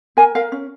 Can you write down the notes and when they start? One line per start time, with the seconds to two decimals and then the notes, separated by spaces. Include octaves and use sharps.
0.17 A#4 G#5
0.35 A#4 F5
0.52 C#4